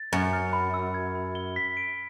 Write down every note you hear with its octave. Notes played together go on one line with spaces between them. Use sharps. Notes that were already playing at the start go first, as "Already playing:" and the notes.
Already playing: A6
F#2 C#7
F6
B5
E6
G#6
B5
G7
B6
D7